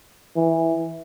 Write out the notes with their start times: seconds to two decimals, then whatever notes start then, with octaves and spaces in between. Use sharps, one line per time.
0.36 E3